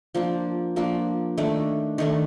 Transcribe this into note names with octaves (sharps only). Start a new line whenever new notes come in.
F3 A#3 D4
F3 A#3 D4
D#3 A3 D4
D#3 A3 D4